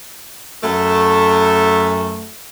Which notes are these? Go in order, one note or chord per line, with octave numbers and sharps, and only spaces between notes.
F#2 A3